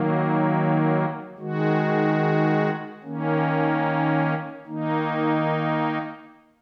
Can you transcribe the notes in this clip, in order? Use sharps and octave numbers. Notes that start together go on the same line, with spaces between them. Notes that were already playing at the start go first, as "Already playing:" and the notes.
Already playing: D#3 F#3 A#3
D#3 G#3 F#4
D#3 A#3 C#4
D#3 A#3 D#4